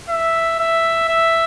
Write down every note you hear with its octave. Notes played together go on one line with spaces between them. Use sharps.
E5
E5
E5